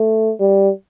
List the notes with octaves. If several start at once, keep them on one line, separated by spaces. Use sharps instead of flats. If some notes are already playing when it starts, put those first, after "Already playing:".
Already playing: A3
G3